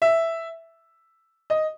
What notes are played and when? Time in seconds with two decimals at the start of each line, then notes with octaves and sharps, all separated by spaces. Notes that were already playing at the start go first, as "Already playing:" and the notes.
0.02 E5
1.50 D#5